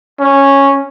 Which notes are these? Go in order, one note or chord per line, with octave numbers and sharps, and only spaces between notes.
C#4